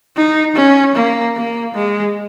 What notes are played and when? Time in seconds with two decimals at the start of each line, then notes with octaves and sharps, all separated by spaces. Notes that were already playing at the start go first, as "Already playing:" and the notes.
0.17 D#4
0.56 C#4
0.96 A#3
1.36 A#3
1.74 G#3